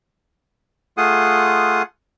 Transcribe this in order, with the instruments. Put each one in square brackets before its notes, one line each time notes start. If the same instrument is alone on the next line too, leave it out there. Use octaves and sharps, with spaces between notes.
[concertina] A3 F4 G#4 F#5 C6 D#6